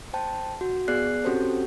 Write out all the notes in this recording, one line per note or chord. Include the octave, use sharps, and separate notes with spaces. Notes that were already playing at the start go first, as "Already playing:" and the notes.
C5 G5 A5
F#4
B3 G#4 D5 F#6 C7
C4 C#4 F#4 G4 A4 C5